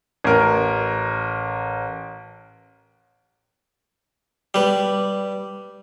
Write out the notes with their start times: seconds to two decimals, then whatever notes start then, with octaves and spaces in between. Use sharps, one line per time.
0.24 A1 A#4
4.54 G3 B4